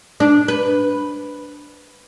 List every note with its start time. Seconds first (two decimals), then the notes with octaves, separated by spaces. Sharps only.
0.20 D4
0.48 B4